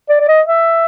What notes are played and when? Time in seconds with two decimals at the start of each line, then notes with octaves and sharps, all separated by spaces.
0.09 D5
0.20 D5
0.28 D#5
0.47 E5